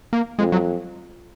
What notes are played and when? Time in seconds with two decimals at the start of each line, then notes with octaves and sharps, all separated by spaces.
0.13 A#3
0.39 F2 G#3
0.52 F#3